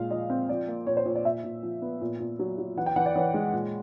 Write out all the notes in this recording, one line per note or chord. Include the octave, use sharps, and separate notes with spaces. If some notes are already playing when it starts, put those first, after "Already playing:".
Already playing: A#2 G#3 F5
F3 D#5
C4
F3 D5
A#3
A#2 C#5
C5
A#2 C#5
D5
A#2 E5
A#2
F3
B3
A#2
A#2
F#3
F#3
E3 F#5
G5
E3 F#5
D5
E3 C#5
G#3
A#2